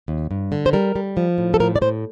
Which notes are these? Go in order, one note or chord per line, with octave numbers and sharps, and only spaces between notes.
D#2
G2
D3
C5
G3 A#4
G3
F3
A2
A4
A2 A#4
D5
A2 C5